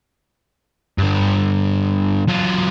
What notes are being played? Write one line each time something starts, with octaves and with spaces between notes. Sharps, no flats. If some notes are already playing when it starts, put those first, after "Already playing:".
G2 D3
F#3 F4